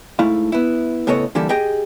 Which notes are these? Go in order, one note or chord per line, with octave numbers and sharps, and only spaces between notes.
G#2 A3 E4 F5
B3 E4
A2 C#3 B3 A4 C#5 D#5
D3 E3 G3 A#3 G4 A4
G4 G#4 D#5 G5